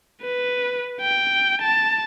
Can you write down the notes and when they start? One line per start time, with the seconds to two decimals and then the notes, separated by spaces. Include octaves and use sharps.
0.21 B4
1.01 G5
1.62 A5